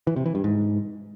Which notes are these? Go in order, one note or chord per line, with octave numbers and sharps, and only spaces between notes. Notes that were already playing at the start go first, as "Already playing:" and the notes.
E3
C3
E3
G2
G#2